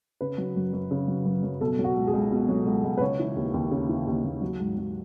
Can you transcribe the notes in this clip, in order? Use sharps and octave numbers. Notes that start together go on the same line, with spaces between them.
C#3 B4
F#3
F#2
F#2
C#3
F#3
F#2
F#2
B2 A4
F#3
F#4
C#2
G#4
C#2
B2
F#3
C#2
C#2
B4
C#3 C#5
E3
D#2
D#2
C#3
E3
D#2
D#2
F#3
G#2
F#3